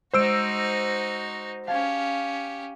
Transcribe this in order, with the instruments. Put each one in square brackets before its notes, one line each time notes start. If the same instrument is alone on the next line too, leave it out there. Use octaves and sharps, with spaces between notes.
[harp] G#3 [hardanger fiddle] D#4 F#4 [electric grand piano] C5 E6 D7
[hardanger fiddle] C#4 G4 [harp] F5 A5 G#6